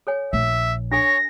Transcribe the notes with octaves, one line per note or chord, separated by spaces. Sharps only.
A4 C#5 G#5
A#1 E5
D4 A4 C#5 G#5 A#6